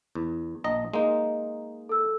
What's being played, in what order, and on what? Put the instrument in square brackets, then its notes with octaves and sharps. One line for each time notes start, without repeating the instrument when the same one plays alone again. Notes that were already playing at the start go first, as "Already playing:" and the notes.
[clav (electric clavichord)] E2
A#1 D#5 A#5
G#3 A#3 D#4
[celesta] A4 E6